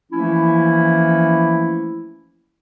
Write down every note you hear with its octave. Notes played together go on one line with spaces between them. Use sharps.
E3 F3 A3 A#3 C#4 E4